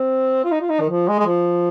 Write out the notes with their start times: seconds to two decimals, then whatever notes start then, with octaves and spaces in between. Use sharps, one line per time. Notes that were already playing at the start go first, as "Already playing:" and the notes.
Already playing: C4
0.44 F4
0.52 D#4
0.61 F4
0.70 D#4
0.80 D#3
0.89 F3
1.08 G#3
1.19 G#3
1.26 F3